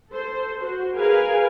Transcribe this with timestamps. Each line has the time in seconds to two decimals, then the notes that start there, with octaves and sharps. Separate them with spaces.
0.11 A4 C5
0.60 F#4 C5
0.96 G#4 A#4 B4 F5 G#5